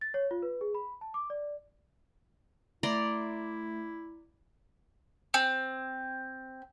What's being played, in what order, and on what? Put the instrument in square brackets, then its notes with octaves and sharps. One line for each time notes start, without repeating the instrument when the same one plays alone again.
[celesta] A6
C#5
F4
B4
G#4
B5
A5
D6
D5
[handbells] A3 [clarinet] E4 [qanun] D5 A#5 C6
[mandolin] C4